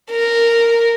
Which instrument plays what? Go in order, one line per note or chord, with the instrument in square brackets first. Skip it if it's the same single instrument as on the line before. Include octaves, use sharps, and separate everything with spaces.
[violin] A#4